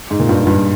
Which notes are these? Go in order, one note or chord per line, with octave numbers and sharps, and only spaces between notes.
G#2
A#2
G2
G#2
G2